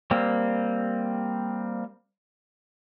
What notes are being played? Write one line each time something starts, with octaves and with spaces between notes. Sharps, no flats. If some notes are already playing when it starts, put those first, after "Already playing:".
G3 A#3 C4